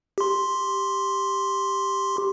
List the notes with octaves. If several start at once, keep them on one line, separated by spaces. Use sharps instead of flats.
G4 C6